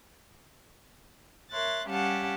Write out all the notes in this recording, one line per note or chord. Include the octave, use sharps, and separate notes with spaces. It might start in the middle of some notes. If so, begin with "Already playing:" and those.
A#4 C#5 E5 C6 F#6 A6
G3 C#4 G4 F5 F#5 A5